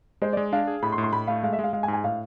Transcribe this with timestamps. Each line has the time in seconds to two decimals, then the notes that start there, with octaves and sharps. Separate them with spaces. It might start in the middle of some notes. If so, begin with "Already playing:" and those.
0.22 G#3 C5
0.33 D5
0.37 G#3
0.53 D4 F5
0.67 G#4
0.82 A2 B5
0.92 C6
0.98 A2
1.03 C6
1.13 A2 B5
1.27 A3 F5
1.43 G#3 F5
1.53 E5
1.59 G#3 F5
1.73 G#3 F5
1.83 G#5
1.88 G#2
1.93 G#5
2.04 A2 F5